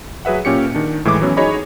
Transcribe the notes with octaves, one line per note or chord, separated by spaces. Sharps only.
F#3 G#4 B4 E5 F#5
A#2 C#4 G4 C#7
D#3 D4
A2 E3 G#3 E4 D6
E3 F#3 B3 C#4
D#4 F#4 G#4 C#5 D#5 B5